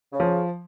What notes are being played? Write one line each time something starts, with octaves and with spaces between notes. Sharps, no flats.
C#3
F3